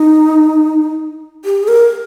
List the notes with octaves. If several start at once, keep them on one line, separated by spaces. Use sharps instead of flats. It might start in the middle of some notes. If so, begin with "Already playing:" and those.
Already playing: D#4
G4
G#4
A#4